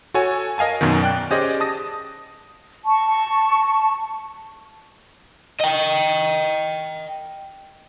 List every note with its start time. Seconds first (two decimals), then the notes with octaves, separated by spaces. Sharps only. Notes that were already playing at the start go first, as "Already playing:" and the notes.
0.14 F#4 A4 C#5 G#5
0.58 A#4 D#5 F5 G#5 A5
0.81 F#2 B2 D#3
1.02 D5 G5 F#6
1.31 C#4 G4 G#4 C5 D5 D#5
1.60 A5 D#6 A#6
2.86 A5 C#6
5.61 D#5 G5